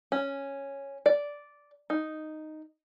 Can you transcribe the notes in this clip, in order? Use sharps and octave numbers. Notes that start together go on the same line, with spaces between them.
C#4
D5
D#4